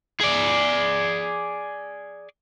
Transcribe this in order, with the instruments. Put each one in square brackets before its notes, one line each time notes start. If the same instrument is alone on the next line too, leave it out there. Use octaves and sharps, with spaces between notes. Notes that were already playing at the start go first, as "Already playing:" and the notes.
[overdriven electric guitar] G#4 D5